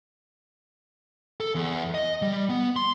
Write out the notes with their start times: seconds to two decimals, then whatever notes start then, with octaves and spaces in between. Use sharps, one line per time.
1.40 A4
1.55 E2
1.95 D#5
2.22 G3
2.49 B3
2.76 C6